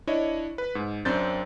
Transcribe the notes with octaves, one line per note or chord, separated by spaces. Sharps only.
D4 E4 C#5 D#5
B4
G#2
F#2 C4 D4 G6 A6